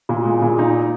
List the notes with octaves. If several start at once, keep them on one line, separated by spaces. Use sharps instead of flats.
A#2
G#3
A#2
D#4